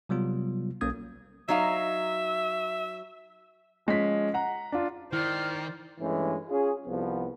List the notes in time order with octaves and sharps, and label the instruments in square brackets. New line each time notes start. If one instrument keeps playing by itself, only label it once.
[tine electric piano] C3 F#3 G3 B3 F4
B1 A#3 C#4 D#6 G#6
[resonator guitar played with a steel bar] F#3 D#4 F5 [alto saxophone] E5
[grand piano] F3 G#3 C#4 B6
F#5 A#5
D4 F4
[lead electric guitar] D#3 [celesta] E4 [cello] C5 D5 [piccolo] F6
[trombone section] G2 E3 G#3 A3 C#4
C#4 F4 G#4
C2 F3 B3